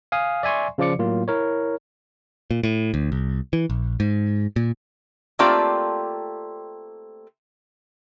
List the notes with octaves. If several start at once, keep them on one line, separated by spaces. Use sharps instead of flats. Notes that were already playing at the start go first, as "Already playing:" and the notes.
F5 G#5 D#6
D5 E5 G#5 C6 C#6
C#3 F3 F4 D5 D6 C#7
A2 F#3 A#3 F4
E4 A#4 C#5
A#2
A2
D2
C2
E3
A#1
G#2
A#2
A3 A#3 C4 F4 G4 D5